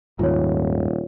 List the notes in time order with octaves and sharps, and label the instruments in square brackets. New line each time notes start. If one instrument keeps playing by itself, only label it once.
[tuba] D#1 [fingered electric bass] D#2 G#2 [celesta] F4 C#5